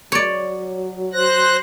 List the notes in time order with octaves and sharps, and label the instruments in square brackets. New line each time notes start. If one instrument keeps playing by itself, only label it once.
[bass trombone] F#3 [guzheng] C#5 D5
[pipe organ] C5 F#6 A#6